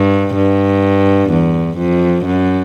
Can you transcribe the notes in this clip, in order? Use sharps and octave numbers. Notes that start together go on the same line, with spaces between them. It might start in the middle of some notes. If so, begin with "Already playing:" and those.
Already playing: G2
G2
E2
F2
F#2